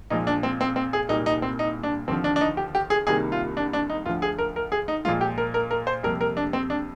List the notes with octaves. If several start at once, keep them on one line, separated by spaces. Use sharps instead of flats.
A#2 F3 G#3 D#4
D4
C4
C4
C4
G#4
C2 A#2 G3 A#3 D#4
D#4
C4
D#4
D4
D#2 D3 F3 C4
D4
D4
D#4
G4
G4
G#4
C2 C3 D#3 G3 A#3 G#4
F4
D4
D4
D#4
D2 D3 F3 F4
G#4
A#4
A#4
G#4
D#4
A#2 F3 G#3 F4
G4
A#4
A#4
A#4
C5
F2 C3 G3 A#3 A#4
A#4
D4
C4
D4